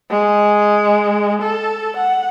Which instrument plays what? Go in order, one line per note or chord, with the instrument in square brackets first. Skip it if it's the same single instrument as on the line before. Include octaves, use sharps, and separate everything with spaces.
[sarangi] G#3
A4
F#5